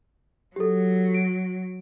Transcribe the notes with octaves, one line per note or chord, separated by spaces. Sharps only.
F#3 G4 A4
D7